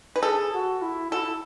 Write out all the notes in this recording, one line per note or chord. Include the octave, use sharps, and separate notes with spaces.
B4
G#4 A4
F#4
E4
E4 F#4 A4